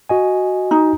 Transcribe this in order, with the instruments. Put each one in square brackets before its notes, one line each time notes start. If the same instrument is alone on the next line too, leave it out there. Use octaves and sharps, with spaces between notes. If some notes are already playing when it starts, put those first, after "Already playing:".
[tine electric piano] F#4 D#5 G#5
[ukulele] D#4